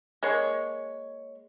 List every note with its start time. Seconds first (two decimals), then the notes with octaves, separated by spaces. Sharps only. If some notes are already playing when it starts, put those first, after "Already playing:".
0.23 G#3 A#3 C#5